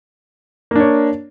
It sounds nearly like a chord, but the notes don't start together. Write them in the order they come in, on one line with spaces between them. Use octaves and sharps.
A#3 D4 C#5